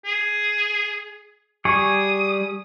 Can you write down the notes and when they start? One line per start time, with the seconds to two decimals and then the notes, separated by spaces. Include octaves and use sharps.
0.05 G#4
1.65 G3 G#4 C#6 D#6